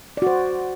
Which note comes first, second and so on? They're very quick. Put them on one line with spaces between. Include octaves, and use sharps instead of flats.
D5 F#4 C5